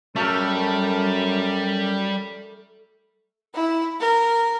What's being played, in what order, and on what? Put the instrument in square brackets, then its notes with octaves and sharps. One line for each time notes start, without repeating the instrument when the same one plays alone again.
[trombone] F#2 [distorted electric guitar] G3 [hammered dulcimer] A3 A4 A#4
[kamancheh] E4
A#4